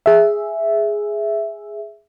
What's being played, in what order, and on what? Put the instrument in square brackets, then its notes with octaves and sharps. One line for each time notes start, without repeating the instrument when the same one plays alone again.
[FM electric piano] G#4 E5